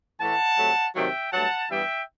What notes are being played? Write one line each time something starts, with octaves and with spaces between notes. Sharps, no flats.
A2 E3 A3 F#5 A5
C3 F#3 A3
C3 D#3 F#3 A3 E5 G5
G2 F#3 A3 F#5 A5
G2 E3 G3 B3 E5 G5